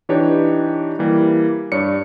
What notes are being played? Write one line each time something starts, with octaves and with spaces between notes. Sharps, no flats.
E3 D4 D#4 G4 B4 C#5
E3 G3 A#3
G2 C#5 D5 C#7